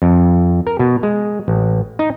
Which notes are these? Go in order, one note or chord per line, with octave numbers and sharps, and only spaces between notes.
F2
A#4
B2
G#3
A1
D#4